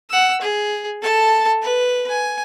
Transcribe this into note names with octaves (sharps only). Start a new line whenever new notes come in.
F#5 E6
G#4
A4 A5
B4
G#5